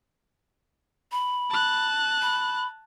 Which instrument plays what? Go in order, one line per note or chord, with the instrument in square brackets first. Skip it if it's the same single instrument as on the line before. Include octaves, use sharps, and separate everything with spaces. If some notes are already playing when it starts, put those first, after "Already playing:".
[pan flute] B5
[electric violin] A5 F#6
[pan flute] B5